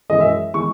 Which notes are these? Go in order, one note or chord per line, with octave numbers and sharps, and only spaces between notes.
F#2 E3 G#3 D#5
E5
E3 G#3 C#6